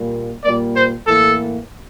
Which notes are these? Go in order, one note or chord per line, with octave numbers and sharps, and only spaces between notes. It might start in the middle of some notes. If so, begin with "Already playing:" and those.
Already playing: A#2 G3 A#3
A#2 G3 A#3 D5
C5
A2 E3 A#3 A4